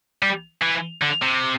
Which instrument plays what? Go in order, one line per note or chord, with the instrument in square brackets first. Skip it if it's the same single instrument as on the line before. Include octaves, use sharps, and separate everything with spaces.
[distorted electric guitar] G3
E3
D3
C3